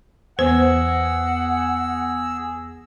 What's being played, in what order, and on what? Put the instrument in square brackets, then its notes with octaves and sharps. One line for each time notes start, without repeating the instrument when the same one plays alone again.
[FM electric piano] E2 B3 A#6 [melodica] G#4 E6 [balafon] C5 [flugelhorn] F#5